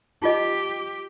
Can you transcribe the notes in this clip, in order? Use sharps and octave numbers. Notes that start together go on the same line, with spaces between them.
D#4 F4 G4 D#5